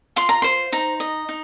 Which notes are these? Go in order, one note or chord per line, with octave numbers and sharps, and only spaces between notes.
F4 C6
A#5
C5 C6
D#4 A#5
D#5
D#4